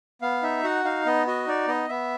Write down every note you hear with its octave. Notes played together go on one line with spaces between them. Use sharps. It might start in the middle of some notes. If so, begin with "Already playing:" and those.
B3 F5
D#4 E5
F#4 F#5
D#4 F5
B3 D#5
F#4 D#5
D#4 D5
B3 D#5
B3 E5